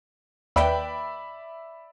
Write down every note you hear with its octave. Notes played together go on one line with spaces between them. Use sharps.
D#2 B4 D5 E5 G5 B5